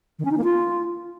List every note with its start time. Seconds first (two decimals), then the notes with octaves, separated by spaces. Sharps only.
0.19 D#3
0.25 C#4
0.31 D#4
0.38 A#3
0.44 F4